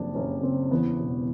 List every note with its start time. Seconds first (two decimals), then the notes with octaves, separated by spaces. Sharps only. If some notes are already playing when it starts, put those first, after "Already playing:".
Already playing: F#1 F2 D4
0.15 F#1 C#4
0.43 C#3 C4
0.71 E2 B3
0.99 E1